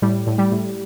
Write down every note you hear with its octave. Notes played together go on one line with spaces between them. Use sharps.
A2 G3
A2
G3
A2